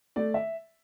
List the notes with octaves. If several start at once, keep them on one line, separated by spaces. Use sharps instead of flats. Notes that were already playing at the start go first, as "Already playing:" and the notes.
A3 D5
E5